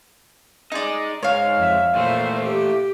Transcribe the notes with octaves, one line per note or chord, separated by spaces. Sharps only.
D#4 G#4 D5 D#5
G#2 C#5 F5
F2 E5
A#2 E3 A3 C5
G4